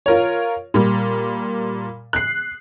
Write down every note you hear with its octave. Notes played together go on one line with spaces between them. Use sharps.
F4 A#4 C#5
A#2 G3
F#6 C7